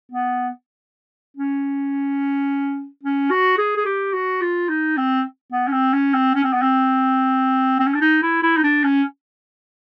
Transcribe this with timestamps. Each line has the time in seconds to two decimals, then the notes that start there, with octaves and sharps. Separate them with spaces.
0.12 B3
1.37 C#4
3.03 C#4
3.30 F#4
3.58 G#4
3.77 G#4
3.86 G4
4.14 F#4
4.41 F4
4.69 D#4
4.97 C4
5.52 B3
5.68 C#4
5.73 C4
5.93 C#4
6.14 C4
6.35 C#4
6.44 C4
6.53 B3
6.62 C4
7.80 C4
7.87 C#4
7.94 D4
8.01 D#4
8.22 E4
8.43 E4
8.57 D#4
8.64 D4
8.84 C#4